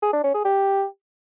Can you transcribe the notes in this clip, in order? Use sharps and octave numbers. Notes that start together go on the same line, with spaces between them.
G#4
D4
C#4
G#4
G4